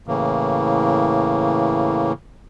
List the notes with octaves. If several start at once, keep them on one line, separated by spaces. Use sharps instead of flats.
A2 C#3 E3 A#3